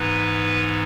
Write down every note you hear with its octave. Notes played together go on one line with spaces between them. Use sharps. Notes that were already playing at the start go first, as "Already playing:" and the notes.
Already playing: G#2 E3 B3 D#4 B4